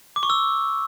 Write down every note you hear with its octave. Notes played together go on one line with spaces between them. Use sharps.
D6
C#6
E6